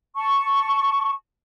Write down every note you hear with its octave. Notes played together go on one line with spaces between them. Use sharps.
A5 C#6